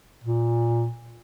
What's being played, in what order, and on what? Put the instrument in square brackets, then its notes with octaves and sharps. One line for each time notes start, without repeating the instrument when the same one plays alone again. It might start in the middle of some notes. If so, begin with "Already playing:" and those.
[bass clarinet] A#2